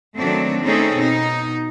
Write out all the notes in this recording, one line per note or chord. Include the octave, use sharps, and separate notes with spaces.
D#3 F#3 A3 C4 D4
A3 C4 C#4 D#4 G#4 A4
B2 D#4